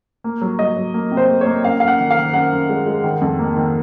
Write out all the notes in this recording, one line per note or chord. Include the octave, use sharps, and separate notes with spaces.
A#3
F#3
F#3 D#5
F#3
A#3
C3
C5
A#3
C#5
A#3
F#2 F5
F#2 F5
F#5
D#3
F5
D#3
F#2 F#5
F#2
G#3
G#3
D#3
F2
A#3
D#3